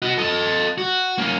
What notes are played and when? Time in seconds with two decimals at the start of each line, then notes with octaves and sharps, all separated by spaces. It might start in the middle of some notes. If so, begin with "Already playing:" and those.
0.02 F#4 D#5
0.18 A4 D#5
0.78 F#4
1.18 A#3 C#4